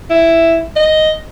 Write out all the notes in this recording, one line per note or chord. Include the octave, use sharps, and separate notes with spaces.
E4
D#5